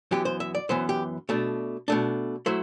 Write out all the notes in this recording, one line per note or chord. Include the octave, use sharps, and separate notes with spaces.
F#2 E3 B3 G4
C5
E5
D5
F#2 E3 B3 C5
G4
B2 A3 D4
B2 A3 D4
F#3 A3 E4 C5